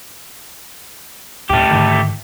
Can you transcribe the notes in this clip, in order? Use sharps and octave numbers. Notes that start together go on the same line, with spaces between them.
D2 A2 A3 G4
G#2 D3 D#3